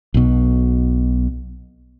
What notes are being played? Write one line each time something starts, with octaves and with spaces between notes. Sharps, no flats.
B1 B2